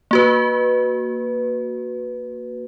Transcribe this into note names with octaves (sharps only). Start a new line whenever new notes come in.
A#3 F#4 B4